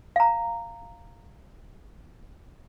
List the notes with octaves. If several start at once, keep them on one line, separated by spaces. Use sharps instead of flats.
F5 A#5